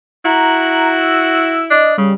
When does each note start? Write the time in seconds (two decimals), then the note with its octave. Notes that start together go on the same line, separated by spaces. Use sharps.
0.25 E4 F#4 A#5
0.99 E6
1.70 D4 D#5
1.98 C#3 G3